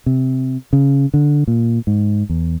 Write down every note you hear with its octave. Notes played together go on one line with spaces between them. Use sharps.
C3
C#3
D3
A#2
G#2
E2